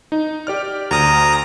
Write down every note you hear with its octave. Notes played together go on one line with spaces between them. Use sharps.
D#4
G4 D5 F6
D2 A#5 D#6